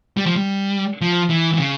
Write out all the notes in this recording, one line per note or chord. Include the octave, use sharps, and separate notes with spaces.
G3
F3
G3
F3
E3
E3
C#3